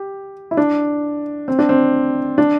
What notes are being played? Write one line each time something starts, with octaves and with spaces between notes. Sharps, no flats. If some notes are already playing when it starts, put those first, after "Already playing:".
Already playing: G4
E4
D4
C4
D4
C4
D4